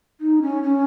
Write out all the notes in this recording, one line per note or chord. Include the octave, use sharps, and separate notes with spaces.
D#4
C#4
C#4